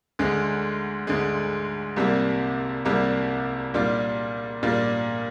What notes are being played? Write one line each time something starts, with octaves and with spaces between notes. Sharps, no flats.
D2 D3 G#3
D2 D3 G#3
C2 C3 G3 A#3
C2 C3 G3 A#3
A#2 G3 D4 F4
A#2 G3 D4 F4